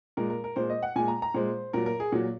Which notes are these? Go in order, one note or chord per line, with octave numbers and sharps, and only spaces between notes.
A#2 G#3 A#4
A#4
A#4
A#2 G#3 C5
D#5
F#5
A#2 G#3 G#5
A#5
A#5
A#2 G#3 C5
A#2 F#3 A#4
A#4
G#4
A#2 F#3